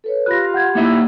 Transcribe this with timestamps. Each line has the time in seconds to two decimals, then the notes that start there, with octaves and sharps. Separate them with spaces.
0.04 A4 B4 C#5
0.26 F4 G4 B5 F#6 A#6
0.54 F#5 G6 G#6
0.75 A#3 D#4 E4 E5